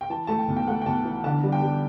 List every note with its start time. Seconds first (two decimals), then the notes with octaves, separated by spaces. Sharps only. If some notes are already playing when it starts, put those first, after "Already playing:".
0.01 G5
0.10 E3 A5
0.27 A3 A5
0.39 G5
0.48 B1
0.57 G5
0.67 A3 F#5
0.82 G5
0.86 B1 A5
1.05 E3
1.24 D3 A5
1.43 G3
1.52 G5
1.62 G3